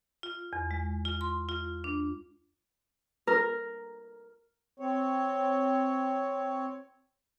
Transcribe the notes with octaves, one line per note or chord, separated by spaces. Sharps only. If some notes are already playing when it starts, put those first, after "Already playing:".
F4
E2
G#3
F4
C6
F4
D4
A#4
C4 C#5